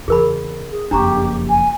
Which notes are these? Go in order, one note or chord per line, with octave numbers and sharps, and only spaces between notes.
E2 C#3 G#4 A#4 B5
G#4
F#1 F2 D4 G4 A#5 C#6
G#5